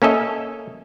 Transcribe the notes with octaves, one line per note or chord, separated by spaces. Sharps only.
A#3 C#4 A4 D#5 E5